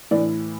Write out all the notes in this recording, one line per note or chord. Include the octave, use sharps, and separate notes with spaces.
A2 E3 D4 D5